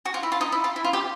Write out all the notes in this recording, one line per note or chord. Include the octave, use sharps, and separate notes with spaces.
F#4
F4
E4
F4
D#4
E4
F4
E4
F4
G4